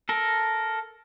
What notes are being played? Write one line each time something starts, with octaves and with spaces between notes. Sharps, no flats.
A4 A#4